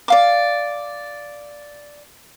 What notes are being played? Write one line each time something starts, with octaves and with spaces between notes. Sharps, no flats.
D5 F5 D6